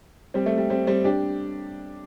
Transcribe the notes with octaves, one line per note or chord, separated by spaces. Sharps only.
G3 C4
A3
G3
G3 C4
G3 C4
D4 G4